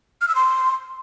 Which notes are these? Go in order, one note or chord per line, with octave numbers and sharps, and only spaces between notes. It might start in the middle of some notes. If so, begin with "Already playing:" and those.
F6
E6
C6